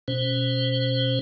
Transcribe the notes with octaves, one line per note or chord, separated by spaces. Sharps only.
B2 C#4 C5